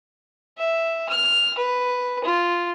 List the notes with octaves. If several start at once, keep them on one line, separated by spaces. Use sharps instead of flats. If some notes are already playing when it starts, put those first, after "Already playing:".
E5
F6
B4
F4